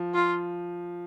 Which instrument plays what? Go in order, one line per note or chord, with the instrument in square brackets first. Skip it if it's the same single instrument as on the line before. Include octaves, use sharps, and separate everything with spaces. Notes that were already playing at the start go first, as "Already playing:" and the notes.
Already playing: [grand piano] F3
[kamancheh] F4